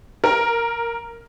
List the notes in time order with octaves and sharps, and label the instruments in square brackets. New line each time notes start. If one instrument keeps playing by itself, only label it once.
[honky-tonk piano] A#4